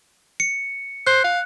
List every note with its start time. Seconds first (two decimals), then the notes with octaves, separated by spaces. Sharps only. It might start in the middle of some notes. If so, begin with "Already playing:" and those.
0.40 C#7
1.07 C5 F#6
1.24 F5